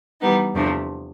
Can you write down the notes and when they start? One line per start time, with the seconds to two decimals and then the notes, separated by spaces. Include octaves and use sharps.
0.20 E3 G3 B3 D#4
0.54 E2 C3 F3 A3 D4